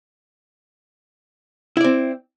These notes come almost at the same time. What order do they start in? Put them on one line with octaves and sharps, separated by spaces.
E4 D5 C4